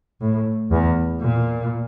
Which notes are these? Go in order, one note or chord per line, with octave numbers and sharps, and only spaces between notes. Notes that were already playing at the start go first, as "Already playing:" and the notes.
A2
E2
A#2